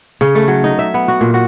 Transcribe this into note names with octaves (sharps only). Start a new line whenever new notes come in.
C#3
A3
F#3
D#4
E5
B3
F#4
A#2
F#4